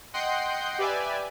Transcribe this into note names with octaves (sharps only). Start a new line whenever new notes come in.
D#5 F#5 G5 C6 G6 C7
G4 B4 D5 E5 G#5